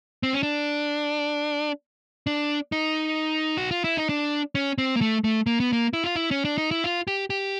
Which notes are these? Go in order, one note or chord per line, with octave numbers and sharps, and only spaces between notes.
C4
C#4
D4
D4
D#4
F#4
F4
E4
D#4
D4
C#4
C4
A#3
A3
A3
A#3
B3
A#3
E4
F4
E4
C#4
D4
D#4
E4
F4
G4
G4